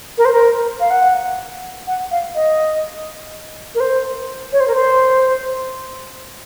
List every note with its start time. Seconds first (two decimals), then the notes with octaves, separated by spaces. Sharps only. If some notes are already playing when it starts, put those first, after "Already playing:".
0.18 A#4
0.25 C5
0.33 A#4
0.80 F5
0.90 F#5
1.87 F#5
2.11 F5
2.35 D#5
3.75 A#4
3.80 C5
4.53 C#5
4.60 C5
4.68 A#4
4.75 C5